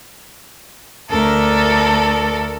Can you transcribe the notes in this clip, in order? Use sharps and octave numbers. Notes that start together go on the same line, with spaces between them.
D2 A4 A#4